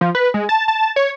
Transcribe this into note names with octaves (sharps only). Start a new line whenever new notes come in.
F3
B4
G#3
A5
A5
C#5